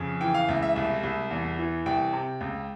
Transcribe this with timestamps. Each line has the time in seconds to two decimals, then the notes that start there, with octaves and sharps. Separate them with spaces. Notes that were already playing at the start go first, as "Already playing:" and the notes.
Already playing: F2 C#3
0.21 E3 G5
0.34 F5
0.49 C#2 E5
0.63 E5
0.76 C2 E5
1.03 C2
1.31 E2
1.59 E3
1.86 C2 G5
2.13 C3
2.41 C#2